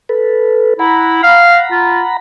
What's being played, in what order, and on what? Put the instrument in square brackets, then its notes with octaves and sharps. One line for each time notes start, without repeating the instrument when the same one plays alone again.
[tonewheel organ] A4 B4
[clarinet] E4 [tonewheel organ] F#5 A#5 B5
[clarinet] F5
F4